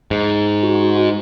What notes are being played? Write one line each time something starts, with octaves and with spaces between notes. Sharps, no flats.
G#2
F#4